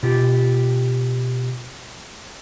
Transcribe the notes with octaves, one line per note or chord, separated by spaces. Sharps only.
B2 F4 G4